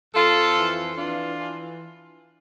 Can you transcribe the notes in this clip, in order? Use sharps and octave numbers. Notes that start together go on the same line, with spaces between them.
F2 F4 A4
E3
E3 D4 F4
E3